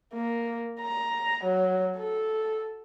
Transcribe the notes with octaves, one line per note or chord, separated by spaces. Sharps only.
A#3
A#5
F#3
A4